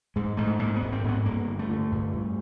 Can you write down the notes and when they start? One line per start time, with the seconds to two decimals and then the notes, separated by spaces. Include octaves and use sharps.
0.16 G#2 G#3
0.37 G#2 A3
0.59 G#2 A#3
0.76 B3
0.82 G#2
0.92 C4
1.04 G#2 B3
1.26 G2 A#3
1.47 D3
1.59 A3
1.70 D3
1.92 G2
2.14 G2